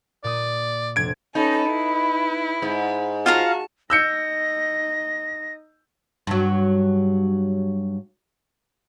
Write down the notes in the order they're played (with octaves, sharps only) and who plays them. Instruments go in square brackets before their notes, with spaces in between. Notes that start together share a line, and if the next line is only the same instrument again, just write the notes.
[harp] A#2 D#6 [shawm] D5
[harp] F1 D4 [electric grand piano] G#6 D7
[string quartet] C#4 A4 [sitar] D#4 [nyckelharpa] B4 B5
[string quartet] E4
[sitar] G#2
[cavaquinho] F4 F5 A#5 [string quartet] F#4 [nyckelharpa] A5
[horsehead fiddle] D#4 D#5 [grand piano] E6 G6 C#7 [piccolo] A#6
[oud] G2 F#3